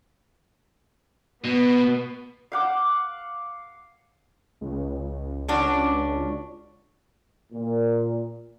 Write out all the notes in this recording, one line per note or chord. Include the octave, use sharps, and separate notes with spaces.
B2 B3
F5 F#5 D6
C#2
C#4 D4 F#4
A#2